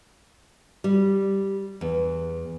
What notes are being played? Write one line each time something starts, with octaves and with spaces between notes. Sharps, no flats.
G3
E2